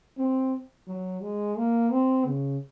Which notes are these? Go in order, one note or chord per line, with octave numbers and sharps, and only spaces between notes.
C4
F#3
G#3
A#3
C4
C#3